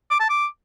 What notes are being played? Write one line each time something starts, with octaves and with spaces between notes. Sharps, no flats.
D6
A5
D6